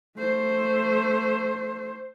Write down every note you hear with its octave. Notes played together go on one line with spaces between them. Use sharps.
A3 C5